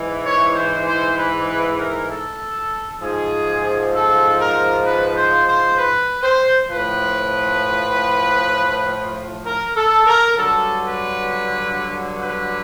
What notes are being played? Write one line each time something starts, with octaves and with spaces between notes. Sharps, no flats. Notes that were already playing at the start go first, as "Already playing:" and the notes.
Already playing: G#2 E3
C#5
C5
C5
B4
B4
A#4
A4
G#2 F3 G#4
A4
A#4
B4
C5
C5
B4
C5
A2 F3 B4
A#4
A4
A#4
G2 D3 F#3 A4
B4
B4